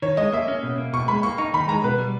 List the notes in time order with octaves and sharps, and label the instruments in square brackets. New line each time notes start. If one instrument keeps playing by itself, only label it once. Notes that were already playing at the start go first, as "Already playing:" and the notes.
[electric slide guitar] D#3 [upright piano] C#5
[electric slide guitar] G#3 [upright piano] D#5
[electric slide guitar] A#3 [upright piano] E5
[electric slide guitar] C#4
B2
A#3
[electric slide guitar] B2 [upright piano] C#6
[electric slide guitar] G#3 [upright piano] B5
[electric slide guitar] A#3 [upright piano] C#6
[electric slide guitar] D#4 [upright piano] C#6
[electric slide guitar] D#3 [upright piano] B5
[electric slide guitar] G#3 [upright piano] A#5
[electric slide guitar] B2 [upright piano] B4
[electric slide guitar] G3